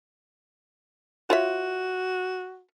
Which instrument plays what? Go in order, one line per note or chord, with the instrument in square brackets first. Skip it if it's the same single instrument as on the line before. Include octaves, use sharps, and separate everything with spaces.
[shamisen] F4 C#5 E5 [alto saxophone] F#4